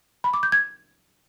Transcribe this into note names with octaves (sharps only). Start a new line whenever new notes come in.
B5
D6
G6
G#6